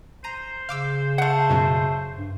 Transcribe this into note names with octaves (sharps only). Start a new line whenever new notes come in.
C5 A#5 D#7
C#3 F5 D6 E6
A3 F#5
F#2 B2 F#3
G2